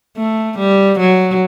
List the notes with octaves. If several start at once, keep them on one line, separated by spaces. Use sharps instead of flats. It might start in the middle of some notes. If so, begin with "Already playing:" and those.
A3
G3
F#3